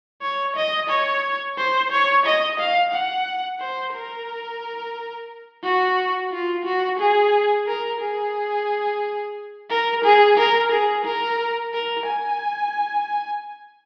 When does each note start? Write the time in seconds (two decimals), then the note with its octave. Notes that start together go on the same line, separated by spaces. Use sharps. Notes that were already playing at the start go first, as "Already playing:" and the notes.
0.22 C#5
0.56 D#5
0.89 C#5
1.58 C5
1.91 C#5
2.25 D#5
2.59 F5
2.93 F#5
3.60 C5
3.94 A#4
5.63 F#4
6.32 F4
6.65 F#4
6.99 G#4
7.67 A#4
8.01 G#4
9.70 A#4
10.04 G#4
10.38 A#4
10.72 G#4
11.05 A#4
11.73 A#4
12.07 G#5